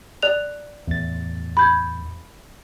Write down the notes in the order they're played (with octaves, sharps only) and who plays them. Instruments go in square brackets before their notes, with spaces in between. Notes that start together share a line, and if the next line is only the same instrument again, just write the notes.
[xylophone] D5 F#6 F7
[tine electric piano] E2 A2 A6
[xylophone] B5 G6 G#6